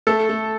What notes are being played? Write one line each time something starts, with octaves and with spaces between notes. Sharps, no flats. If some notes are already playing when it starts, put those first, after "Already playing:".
A3 A4
A3